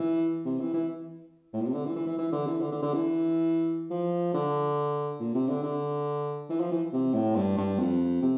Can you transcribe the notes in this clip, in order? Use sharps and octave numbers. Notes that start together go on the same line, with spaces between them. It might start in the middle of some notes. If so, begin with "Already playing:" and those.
Already playing: E3
C3
E3
E3
A2
A#2
C3
D3
E3
E3
E3
E3
D3
E3
D3
D3
D3
E3
F3
D3
A#2
C3
D3
D3
E3
F3
E3
C3
A2
G2
G2
F2
C3